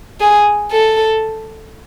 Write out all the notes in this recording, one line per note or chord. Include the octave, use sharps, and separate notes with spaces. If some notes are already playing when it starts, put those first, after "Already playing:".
G#4
A4